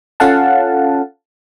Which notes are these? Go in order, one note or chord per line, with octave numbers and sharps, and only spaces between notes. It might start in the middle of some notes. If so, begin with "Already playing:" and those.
C#4 F4 A4 F5 F#5 A5